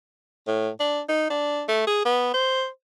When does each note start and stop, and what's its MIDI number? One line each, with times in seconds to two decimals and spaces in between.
0.47 0.69 45
0.80 1.01 62
1.09 1.29 63
1.30 1.63 62
1.68 1.84 57
1.87 2.02 68
2.05 2.31 59
2.34 2.67 72